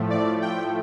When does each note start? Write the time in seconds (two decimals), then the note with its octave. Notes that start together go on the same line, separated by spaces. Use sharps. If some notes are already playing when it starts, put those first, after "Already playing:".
Already playing: A2 F3 A3
0.10 D5
0.42 G5